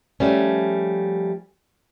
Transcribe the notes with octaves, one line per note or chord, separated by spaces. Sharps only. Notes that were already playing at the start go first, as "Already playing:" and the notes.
F3 G3 A3 C#4